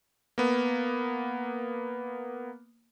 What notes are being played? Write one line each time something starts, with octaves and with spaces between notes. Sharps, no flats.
A#3 B3